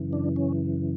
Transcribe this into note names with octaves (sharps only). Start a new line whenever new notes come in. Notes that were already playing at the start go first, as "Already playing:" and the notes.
Already playing: F#2 C#3 E3
D4
C#4